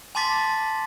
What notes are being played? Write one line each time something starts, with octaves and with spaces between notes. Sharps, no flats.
G#5 A5 C6 D6 A6 B6